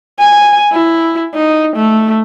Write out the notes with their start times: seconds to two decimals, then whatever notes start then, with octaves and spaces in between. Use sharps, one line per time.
0.19 G#5
0.72 E4
1.35 D#4
1.76 A3